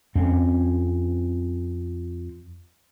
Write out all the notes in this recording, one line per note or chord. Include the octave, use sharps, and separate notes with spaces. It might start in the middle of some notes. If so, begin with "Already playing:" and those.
F2 C4 C#4